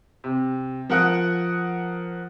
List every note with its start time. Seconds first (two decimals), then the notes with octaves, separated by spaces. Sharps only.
0.24 C3
0.90 F3 A#4 F#5 D#6 F#6